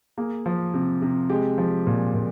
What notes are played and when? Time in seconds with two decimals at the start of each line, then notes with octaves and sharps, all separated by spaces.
0.17 A#3 G#4
0.46 F3
0.74 C3
1.02 C3
1.30 G#3 G4
1.58 F3
1.87 A#2
2.15 A#2